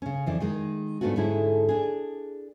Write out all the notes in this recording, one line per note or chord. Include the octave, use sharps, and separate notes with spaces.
C#3 C#4
F2 E3 D5
D#3 G#3 D#4
G#2 A3 B3 D4 F4 F#4
G#2 D3 C#4 E4 G#4 A4
D4 G#4